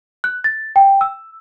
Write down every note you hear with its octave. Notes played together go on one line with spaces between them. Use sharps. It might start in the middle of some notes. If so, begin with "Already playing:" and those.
F#6
A6
G5
E6